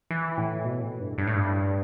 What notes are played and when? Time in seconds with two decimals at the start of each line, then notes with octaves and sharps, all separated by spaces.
0.11 E3
0.38 A2
0.64 B2
0.82 A2
1.00 G2
1.18 G2
1.27 A2
1.36 G2